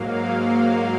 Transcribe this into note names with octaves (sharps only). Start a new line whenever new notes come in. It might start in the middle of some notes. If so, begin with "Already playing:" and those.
Already playing: G#2 F#3 A#3 F5